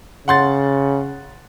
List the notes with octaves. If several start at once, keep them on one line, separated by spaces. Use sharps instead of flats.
C#3 F#5 C6 A6